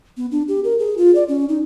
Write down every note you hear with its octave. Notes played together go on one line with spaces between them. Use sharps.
B3
D4
G4
A#4
G#4
F4
D5
C#4
D#4